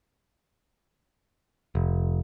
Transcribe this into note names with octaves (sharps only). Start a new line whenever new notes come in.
F1